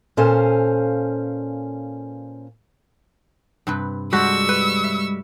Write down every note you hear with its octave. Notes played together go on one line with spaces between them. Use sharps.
A#2 C#4 A4 C5 F5 G#5
G2 C3 B4
G3 G#3 F#4 A4 C5 C#6 E6
B4
E5